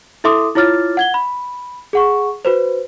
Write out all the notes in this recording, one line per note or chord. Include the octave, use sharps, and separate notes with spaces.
E4 A4 E5 C6 D6 D#6
E4 F4 C#5 D6 F6 A6
F#5 G#6 G7
B5
G#4 F#5 C#6
F#4 B4 C5